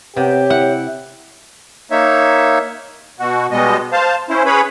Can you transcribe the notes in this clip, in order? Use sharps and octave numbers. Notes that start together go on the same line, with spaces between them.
C3 B3 G4 C#5
E4 F#5
A#3 D#4 C#5 E5
B2 F#4
B2 G3 G#3 B3 D#5
C5 F5 A5
C#4 E4 C5
C#4 G#4 B4 C#5 B5